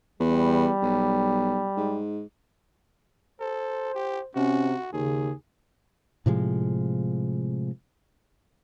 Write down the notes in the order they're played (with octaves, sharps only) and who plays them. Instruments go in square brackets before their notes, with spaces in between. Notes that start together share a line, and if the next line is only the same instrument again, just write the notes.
[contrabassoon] E2 [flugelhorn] G3
[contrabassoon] B1
G#2
[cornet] A4 [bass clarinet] C5
[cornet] G4
[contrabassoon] C3 [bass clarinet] C#4 [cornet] F#4
[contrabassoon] D#2 [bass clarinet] C#3 [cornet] G#4
[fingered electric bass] A2 C3 F3 G#3